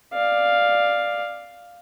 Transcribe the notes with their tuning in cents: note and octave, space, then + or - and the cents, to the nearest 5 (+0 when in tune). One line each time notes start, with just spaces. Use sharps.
D5 +10 F5 +0